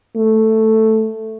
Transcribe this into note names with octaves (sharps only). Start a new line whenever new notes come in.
A3